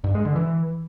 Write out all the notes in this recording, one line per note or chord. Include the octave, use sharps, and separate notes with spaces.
G2
G#3
D3
E3